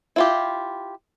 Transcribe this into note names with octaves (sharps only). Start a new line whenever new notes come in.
E4 F4 G4